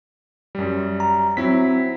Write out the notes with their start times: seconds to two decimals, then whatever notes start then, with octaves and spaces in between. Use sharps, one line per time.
0.55 F#2 G3
1.00 A#5
1.37 F#3 C4 E4 B6